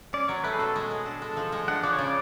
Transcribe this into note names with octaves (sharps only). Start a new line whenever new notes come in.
C#4 D5
F#3 C#5
A3 B4
G#4
B2 A4
G#3 G#4
B3
D4 A4
G#3
F3
G#3
D4 F#5
F3 D5
C#5
C#3 D5